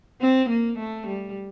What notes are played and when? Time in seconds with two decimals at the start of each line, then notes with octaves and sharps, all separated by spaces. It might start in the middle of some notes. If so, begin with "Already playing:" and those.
0.21 C4
0.50 A#3
0.79 A3
1.08 G3